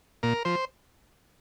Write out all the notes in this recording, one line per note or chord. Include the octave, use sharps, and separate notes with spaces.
A#2 A#4
F3 C5